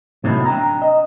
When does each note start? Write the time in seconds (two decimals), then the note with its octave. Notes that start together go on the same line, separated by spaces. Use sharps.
0.24 A2 C3 D#3 F#3 A3 B3
0.46 D4 G5 A#5
0.82 D#5